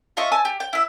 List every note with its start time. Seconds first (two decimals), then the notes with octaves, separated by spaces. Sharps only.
0.17 F4 D#5 E5 C#6
0.32 G#5 A5 E6
0.45 G4
0.60 G5
0.73 E4 E5